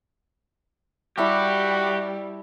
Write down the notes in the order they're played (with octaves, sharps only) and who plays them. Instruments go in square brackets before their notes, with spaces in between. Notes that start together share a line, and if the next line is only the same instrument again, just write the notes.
[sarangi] G3 [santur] E4 E5 A5 [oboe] F#4 [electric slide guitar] G4